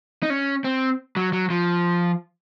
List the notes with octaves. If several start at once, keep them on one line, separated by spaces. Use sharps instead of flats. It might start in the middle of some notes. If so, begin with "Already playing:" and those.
D#4
C#4
C4
F#3
F#3
F3